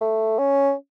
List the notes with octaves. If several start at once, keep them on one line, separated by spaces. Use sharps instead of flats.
A3
C#4